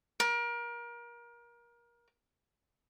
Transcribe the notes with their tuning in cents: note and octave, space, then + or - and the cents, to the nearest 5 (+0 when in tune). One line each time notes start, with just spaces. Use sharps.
A#4 +30